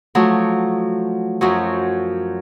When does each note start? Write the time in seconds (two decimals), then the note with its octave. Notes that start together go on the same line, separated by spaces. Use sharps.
0.15 F3 F#3 A3
1.41 F#2 F3 F#3